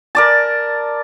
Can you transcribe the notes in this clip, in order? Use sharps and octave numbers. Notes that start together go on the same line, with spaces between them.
A#4 D5 A5